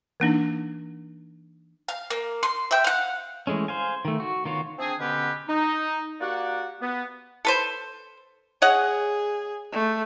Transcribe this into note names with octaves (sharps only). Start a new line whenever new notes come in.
E3 A#3 D4 D#4
F5
A#3
C6
E5 G5
F5 F#5
E3 G#3 A3 C#4
C5 F5 G#5
D#3 A3
F#4
D#3 B3 F4 F#4 C#5
C4 D4 G#4
B2 D3 B3 C#4 G4 B4
D#4
A#3 F#4 G4 D5 F#5
B3
A4 B4 C5
G#4 C#5 D#5 F#5
A3